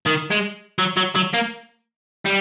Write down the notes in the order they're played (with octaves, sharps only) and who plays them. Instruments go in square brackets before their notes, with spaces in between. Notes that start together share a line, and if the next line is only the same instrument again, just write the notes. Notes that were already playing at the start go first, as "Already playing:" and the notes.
[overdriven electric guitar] D#3
G#3
F#3
F#3
F#3
A#3
G3